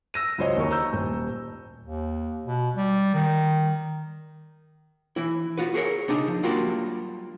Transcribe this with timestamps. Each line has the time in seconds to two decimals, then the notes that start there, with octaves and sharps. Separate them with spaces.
0.14 E6 A#6 D#7
0.38 C#2 F#3 C5 C#5 D#5
0.56 D#2 D#4 A#4 C#6
0.71 A#5 C#6 E6 G6
0.93 D#1
1.82 D#2
2.45 B2
2.76 G3
3.14 D#3
5.16 E3 E4
5.58 F4 F#4 B4
5.74 F#4 G#4 A#4 C#5
6.08 C#3 D4 D#4 G#4
6.27 F3
6.43 F#3 G3 A#3 D4 F4 F#4